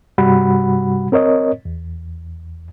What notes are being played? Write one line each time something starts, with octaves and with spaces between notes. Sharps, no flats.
G2 C3 G3 F#4 F#5 B5
C4 A#4 C#5 D#5
E2